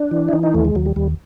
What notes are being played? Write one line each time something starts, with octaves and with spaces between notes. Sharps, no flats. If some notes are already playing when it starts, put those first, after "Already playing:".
Already playing: D4
E3
E4
E3 D#4
D#4
D#2 A3
G#3
D#2 F#3
G3
D#2 G3